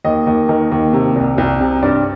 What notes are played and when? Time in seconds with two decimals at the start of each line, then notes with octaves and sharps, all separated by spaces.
0.04 D#2 D#5
0.27 D#2
0.49 D#3
0.72 D#2
0.93 C3
1.16 C2
1.38 C2
1.60 C3
1.82 G2 D5